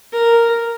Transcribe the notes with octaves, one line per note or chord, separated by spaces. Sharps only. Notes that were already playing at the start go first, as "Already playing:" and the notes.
A#4